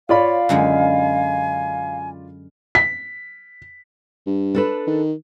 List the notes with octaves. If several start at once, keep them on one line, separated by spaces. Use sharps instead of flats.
F4 C#5 D5 F5 B5
F#2 D3 G#3 G#5
B6
G2
D4 A4 B4
D#3